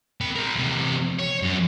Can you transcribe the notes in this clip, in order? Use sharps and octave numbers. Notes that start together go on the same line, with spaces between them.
C4 B5
A#4 C5
E2 C3
C#5
F#2